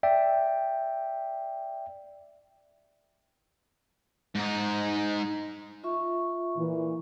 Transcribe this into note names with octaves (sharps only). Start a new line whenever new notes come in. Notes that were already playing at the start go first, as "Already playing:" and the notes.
D5 E5 G5
G#2 D#4
F4 E5 C#6
A#2 E3